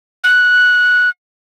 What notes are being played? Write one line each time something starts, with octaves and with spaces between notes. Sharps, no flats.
F#6